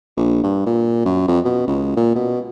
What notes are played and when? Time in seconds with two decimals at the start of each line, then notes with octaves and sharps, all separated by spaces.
0.17 A#1
0.44 G2
0.66 A#2
1.05 F#2
1.28 F2
1.45 B2
1.67 C#2
1.97 A#2
2.15 B2